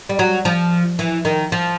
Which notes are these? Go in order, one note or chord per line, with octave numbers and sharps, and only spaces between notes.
G3
F#3
F3
E3
D#3
F3